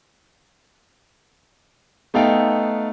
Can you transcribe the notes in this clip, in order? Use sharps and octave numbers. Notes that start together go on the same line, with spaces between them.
A3 B3 D#4 A4 F5 G5